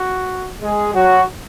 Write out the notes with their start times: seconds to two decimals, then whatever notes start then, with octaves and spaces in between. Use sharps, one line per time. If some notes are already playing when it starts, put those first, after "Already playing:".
Already playing: F#4
0.62 G#3 G#4
0.94 F#3 F#4